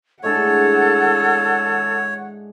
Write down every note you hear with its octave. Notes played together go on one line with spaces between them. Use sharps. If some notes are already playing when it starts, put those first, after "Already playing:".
A2 G#3 D4 A4 C#5 F#5